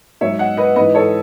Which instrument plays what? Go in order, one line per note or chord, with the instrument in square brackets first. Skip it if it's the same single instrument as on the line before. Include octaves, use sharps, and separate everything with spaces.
[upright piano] G#2 F#3 C#5 E5
D#5 F#5
B4 D#5
G#2 E3 B4 D#5
A4 C#5